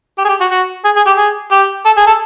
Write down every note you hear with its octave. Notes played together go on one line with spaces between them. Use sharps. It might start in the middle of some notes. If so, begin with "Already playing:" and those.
G4
G#4
G4
F#4
F#4
G#4
G#4
G4
G#4
G4
A4
G#4
A4